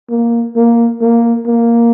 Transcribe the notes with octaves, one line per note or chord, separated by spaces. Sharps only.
A#3
A#3
A#3
A#3